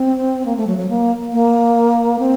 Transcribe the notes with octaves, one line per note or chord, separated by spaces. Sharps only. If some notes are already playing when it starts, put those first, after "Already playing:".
Already playing: C4
A#3
A3
F#3
F#3
A#3
A#3
C4